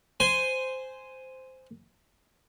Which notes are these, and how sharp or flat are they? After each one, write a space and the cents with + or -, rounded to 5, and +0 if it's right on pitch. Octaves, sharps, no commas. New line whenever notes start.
C5 -10 G#5 +0